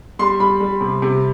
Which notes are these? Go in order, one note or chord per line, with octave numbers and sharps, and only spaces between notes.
G3 C6
G3 B5
G3
C3
C3